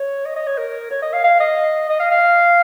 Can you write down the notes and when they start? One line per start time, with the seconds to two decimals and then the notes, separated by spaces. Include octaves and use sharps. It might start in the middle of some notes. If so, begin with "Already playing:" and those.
Already playing: C#5
0.25 D#5
0.36 D#5
0.47 C#5
0.58 A#4
0.91 C#5
1.02 D#5
1.13 F5
1.24 F5
1.40 D#5
1.89 D#5
2.00 F5
2.11 F5